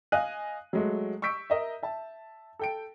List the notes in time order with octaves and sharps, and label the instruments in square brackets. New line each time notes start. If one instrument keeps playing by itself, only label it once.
[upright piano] D#5 F5 G#5 F#6 D#7
F#3 G#3 A3
C#6 E6 G6 B6 D7
A#4 D#5 E5
E5 A5
A4 G5 D7